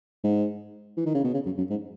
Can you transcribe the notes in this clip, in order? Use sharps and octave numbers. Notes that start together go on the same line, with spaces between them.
G#2
E3
D#3
C#3
B2
C#3
F#2
F#2
G#2